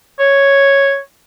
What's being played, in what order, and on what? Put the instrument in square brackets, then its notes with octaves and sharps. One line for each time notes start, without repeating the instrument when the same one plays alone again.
[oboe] C#5